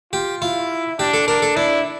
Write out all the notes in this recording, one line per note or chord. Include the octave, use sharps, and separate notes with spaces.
F4 G4
E4 F4
D4 G4
A4
D4 A#4
A4
D4 E4